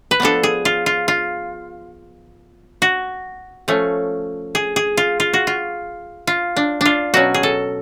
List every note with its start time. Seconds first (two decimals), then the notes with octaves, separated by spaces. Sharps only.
0.11 B4
0.20 F3 B3 D4 A4
0.43 G#4
0.65 F4
0.86 F4
1.08 F4
2.82 F#4
3.68 F3 A3 C#4
4.55 G#4
4.76 G#4
4.97 F4
5.20 F4
5.34 F#4
5.47 F4
6.27 F4
6.57 D4
6.81 D4 F4
7.14 B2 F#3 C#4 F#4
7.34 G#4
7.43 A4